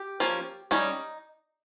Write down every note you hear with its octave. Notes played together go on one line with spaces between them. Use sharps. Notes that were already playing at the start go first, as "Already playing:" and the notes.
Already playing: G4
F3 A#3 C#4
G3 C#4 D#4